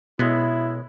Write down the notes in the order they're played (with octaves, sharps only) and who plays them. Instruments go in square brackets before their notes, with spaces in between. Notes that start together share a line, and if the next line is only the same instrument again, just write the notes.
[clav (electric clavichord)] B1 G#3 B3 [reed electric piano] B2 [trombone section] E4